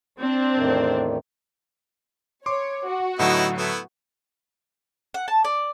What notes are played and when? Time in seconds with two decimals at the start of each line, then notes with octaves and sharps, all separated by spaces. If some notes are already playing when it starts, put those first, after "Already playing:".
0.20 C4 D4
0.55 E2 A2 D#3
2.46 C#5 C6 D6
2.87 F#4
3.19 A2 D3 F#3 B3 D#4 E4
3.58 A3 B3 E4
5.14 F#5
5.28 A5
5.44 D5